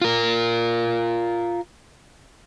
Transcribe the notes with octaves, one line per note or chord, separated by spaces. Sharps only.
F4 A#4